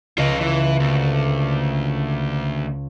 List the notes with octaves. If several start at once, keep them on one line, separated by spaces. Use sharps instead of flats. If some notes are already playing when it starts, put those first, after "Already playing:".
C#2 F4 D#5
E3
D2